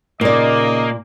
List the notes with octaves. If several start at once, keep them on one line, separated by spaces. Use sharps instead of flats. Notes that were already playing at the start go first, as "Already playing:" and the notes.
A#2 C#3 A#3 D#4 D5 D#5